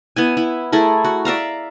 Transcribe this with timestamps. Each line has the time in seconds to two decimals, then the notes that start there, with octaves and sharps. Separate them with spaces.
0.16 B3 E4 G#5
0.37 E4
0.72 A3 E4 G#4 A#4
1.04 F#4
1.25 D5 E5 F5 A#5